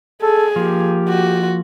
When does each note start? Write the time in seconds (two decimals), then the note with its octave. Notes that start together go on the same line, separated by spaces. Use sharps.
0.22 G#4 A4
0.56 F3 A#3 G4
1.08 F#4